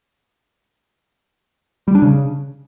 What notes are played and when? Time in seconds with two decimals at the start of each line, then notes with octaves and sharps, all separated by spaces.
1.88 G3
1.95 D4
2.02 C#3